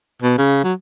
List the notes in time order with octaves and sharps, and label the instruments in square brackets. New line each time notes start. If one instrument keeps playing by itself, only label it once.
[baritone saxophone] B2
C#3
F#3